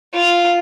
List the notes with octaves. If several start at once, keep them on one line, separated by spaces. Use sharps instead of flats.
F4